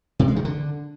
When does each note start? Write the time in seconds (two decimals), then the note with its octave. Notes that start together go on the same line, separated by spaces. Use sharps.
0.19 C3
0.28 G#3
0.36 D#3
0.45 D3